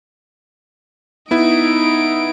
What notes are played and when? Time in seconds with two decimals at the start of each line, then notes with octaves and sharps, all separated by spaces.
1.31 B3 D#4 E4 D7